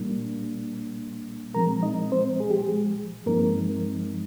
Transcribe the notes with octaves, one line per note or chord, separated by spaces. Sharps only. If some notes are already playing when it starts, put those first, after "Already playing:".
Already playing: A#2 G3 A#3 D4
A#2 F3 G#3 C4 A#4 A#5
D#4 D#5
C4 C5
G#4
G4
G#3 G#4
G2 F3 G#3 A#3 C4 D#4 A#4